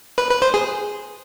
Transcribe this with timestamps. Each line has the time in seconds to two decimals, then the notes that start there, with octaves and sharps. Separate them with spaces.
0.18 B4
0.30 B4
0.42 C5
0.54 G#4